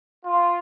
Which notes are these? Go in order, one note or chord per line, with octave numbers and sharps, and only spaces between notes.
F4